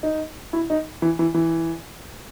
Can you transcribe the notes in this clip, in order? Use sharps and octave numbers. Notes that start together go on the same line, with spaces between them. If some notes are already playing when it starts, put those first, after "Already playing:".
D#4
E4
D#4
E3
E3
E3